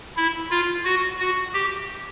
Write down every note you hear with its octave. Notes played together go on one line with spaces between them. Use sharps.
E4
F4
F#4
F#4
G4